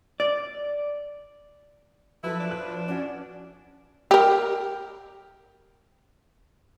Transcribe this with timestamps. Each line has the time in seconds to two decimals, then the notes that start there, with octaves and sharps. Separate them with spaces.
0.20 D5
2.24 F3 F#3 E4 A4 B4
2.40 D4
2.51 F#6
2.88 C#4 F#4 D5
4.11 G4 A#4